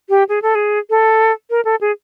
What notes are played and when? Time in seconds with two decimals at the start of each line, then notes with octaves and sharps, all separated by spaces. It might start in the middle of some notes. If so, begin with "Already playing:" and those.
0.09 G4
0.29 G#4
0.42 A4
0.55 G#4
0.90 A4
1.50 A#4
1.65 A4
1.81 G#4